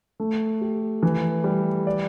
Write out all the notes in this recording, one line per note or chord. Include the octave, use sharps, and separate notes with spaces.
A3
G4
E3
G3
D5